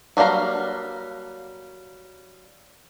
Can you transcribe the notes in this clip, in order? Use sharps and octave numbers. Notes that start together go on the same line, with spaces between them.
F#3 G3 A#3 F5 A#5